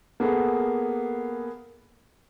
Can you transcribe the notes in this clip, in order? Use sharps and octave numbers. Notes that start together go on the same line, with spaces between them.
A#3 B3 G#4 A4